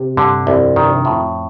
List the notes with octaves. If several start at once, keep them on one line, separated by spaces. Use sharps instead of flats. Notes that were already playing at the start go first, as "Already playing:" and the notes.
Already playing: C3
G2 D3
C2 F2
G2 D#3
F2 A2